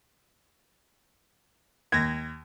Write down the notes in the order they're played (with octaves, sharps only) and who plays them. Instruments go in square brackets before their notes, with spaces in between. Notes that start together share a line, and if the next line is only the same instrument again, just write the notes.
[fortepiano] D#2 [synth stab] G#6 A#6